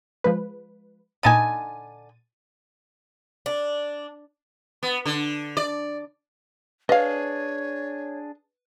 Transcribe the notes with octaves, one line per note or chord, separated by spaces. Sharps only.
F3 G#3 B4
A#2 D3 D#4 G#5 A6 D#7
D4
B3
D3
D5
D4 G#4 B4 C#5 D#5 F5